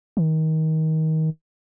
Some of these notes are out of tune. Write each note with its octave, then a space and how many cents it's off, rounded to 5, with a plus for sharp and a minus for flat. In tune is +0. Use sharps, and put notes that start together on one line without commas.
D#3 +25